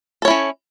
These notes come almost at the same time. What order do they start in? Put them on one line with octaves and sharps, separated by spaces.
A4 C#5 E4 C#4